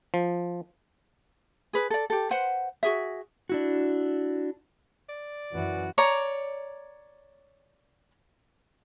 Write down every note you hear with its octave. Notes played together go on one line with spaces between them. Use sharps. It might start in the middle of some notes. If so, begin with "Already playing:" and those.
F3
G#4 B4
A4 D5
G4 A4
B4 C5 F#5
F#4 G#4 E5
D4 E4 F#4
D5
F#2 E3 F#4
C#5 D5 A#5